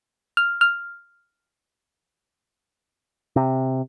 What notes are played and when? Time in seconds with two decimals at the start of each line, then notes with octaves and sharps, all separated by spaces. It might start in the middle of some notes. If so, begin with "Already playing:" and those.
0.37 F6
0.61 F6
3.36 C3